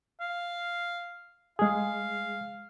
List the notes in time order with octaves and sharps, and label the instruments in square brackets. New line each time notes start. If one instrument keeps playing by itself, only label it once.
[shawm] F5
[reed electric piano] G#3 G#4 [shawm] F5